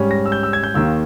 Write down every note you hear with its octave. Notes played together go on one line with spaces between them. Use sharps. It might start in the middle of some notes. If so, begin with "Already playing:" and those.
Already playing: G#2 G3 C#4
A#6
E6
G6
E6
G#6
G6
D#2 D#3 A#3 E6